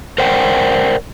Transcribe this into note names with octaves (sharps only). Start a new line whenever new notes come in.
A#4 C5 D5 F#5 G5